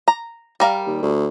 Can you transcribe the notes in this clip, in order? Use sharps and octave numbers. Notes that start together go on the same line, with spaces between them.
A#5
G3 A#4 F5
D#2
D2